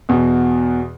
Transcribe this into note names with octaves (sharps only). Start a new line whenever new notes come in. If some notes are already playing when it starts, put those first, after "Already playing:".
E2 B2